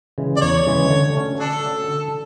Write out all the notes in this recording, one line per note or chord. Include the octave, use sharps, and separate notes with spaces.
C#3 E3 G#3
D5
E2 C#5
C#3 E3 G#3
D3
A3 C#4 F#4
D3 D4 A4
A3 C#4 F#4
D3